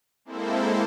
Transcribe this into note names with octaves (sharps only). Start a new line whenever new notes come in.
G#3 A#3 C4 E4 A4 C5